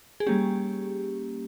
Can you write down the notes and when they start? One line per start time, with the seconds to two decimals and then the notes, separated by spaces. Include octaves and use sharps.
0.20 G#4
0.27 G3 A#3 C#4 G4